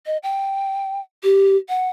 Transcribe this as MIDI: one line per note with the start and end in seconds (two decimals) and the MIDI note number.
0.06 0.18 75
0.23 1.00 79
1.23 1.56 67
1.69 1.89 78